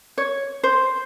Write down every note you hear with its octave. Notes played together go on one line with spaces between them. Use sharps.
C#5
C5